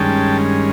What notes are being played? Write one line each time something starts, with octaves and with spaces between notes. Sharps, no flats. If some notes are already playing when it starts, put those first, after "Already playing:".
Already playing: G2 D#3 G#3 C#4 G5 A5